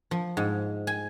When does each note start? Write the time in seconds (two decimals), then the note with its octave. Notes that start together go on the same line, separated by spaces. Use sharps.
0.11 F3
0.37 G#2
0.87 G#5